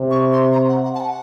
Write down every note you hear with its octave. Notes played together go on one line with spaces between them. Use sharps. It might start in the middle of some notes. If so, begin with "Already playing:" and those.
Already playing: C3
C#6
C6
A#5
F#5
F#5
A5
F#5